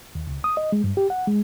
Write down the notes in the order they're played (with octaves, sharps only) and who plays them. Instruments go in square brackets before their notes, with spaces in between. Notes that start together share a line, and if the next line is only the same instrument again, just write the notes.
[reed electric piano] D#2
C#2
D#6
D#5
G#3
G2
G4
F#5
G#3